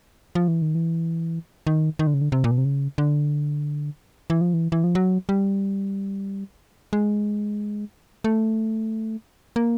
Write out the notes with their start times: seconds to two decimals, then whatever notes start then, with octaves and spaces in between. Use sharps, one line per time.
0.35 F3
0.48 E3
0.62 D#3
0.75 E3
1.67 D#3
1.99 D#3
2.07 D3
2.14 C#3
2.21 D3
2.32 C3
2.44 A#2
2.51 B2
2.58 C3
2.65 C#3
2.98 D3
4.30 E3
4.41 F3
4.54 E3
4.72 E3
4.84 F3
4.95 F#3
5.29 G3
6.93 G#3
8.24 A3
9.56 A#3